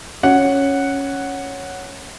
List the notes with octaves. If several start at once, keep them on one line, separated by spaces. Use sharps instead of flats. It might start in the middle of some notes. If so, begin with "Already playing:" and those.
C#4 F#5